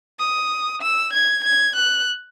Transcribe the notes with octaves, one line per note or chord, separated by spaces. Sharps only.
D#6
E6
G#6
G#6
F#6